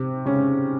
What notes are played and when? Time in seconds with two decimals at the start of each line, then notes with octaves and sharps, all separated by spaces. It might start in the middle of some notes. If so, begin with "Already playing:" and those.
Already playing: C3 C4
0.26 C#3 C#4